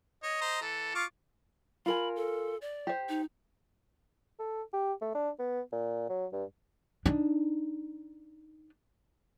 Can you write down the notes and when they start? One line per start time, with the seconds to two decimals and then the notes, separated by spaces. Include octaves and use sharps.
0.23 C#5 D#5
0.41 C5 A#5
0.62 E3 A4
0.95 F4 C#6 D6
1.86 F4 A#4 G#5 B5
2.16 A4
2.62 D5
2.87 G4 C5
3.09 D#4
4.39 A4
4.74 G4
5.02 A3
5.15 D4
5.39 B3
5.73 A#2
6.10 F#3
6.33 G2
7.06 D4 D#4